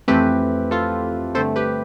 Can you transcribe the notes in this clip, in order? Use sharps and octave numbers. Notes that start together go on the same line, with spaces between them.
F2 E3 A3 C4 G4 B4
F4 A4
G2 D3 A3 C4 A4 C5
G4 B4